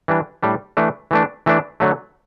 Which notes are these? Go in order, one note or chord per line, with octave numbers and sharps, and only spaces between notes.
E3 G3 D4
A2 G3 D4
E3 A3 D4
E3 A3 D4
E3 A3 D4
D3 F#3 A3